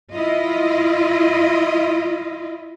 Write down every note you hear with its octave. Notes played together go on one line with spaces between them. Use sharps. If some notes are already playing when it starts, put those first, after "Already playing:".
E4 F4 D#5